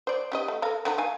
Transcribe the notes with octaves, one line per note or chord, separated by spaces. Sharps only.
C5 D5
C#4 G4 D#5
A3
A4 A#4 F5
D3 D#3 A#5
F5 G#5